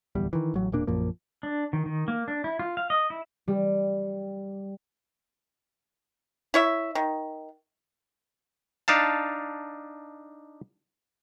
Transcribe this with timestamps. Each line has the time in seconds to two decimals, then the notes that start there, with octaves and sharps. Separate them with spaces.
0.15 D1 E2 G3
0.33 D#3 E3
0.54 A1 F#3
0.72 E1 A#2 A#3 D4
0.87 A#1 F#2 F3 A#3
1.43 D4
1.73 D#3
1.86 D#3
2.08 A#3
2.28 D4
2.44 E4
2.59 F4
2.77 F5
2.90 D#5
3.10 E4
3.48 G3
6.54 E4 C#5 E5
6.95 D#3
8.88 D4 D#4 F5 A5